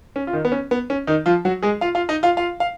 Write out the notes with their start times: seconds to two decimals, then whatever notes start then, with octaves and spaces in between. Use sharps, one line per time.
0.16 C#4
0.27 F4
0.33 D#3 D#4
0.45 B3
0.52 C#4
0.71 B3
0.90 C#4
1.07 D#3 D#4
1.26 F3 F4
1.45 F#3 F#4
1.63 G#3 G#4
1.81 F4 F5
1.95 F4 F5
2.09 D#4 D#5
2.23 F4 F5
2.37 F4 F5
2.60 F5